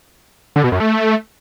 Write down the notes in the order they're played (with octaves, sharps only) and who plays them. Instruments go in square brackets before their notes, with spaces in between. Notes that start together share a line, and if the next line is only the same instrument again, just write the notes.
[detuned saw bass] D3
B2
F#2
A3